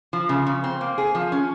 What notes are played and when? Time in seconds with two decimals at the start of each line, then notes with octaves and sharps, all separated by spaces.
0.13 F3
0.29 C#3
0.47 C#3
0.64 C4
0.81 A#3
0.98 G#4
1.15 F3
1.32 C#4